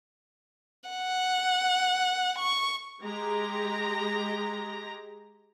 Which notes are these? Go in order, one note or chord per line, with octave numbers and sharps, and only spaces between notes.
F#5
C#6
G#3 G4 A#5